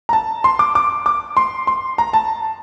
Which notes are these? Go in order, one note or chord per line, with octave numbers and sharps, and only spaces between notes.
A#5
A5
C6
D6
D6
D6
C6
C6
A#5
A5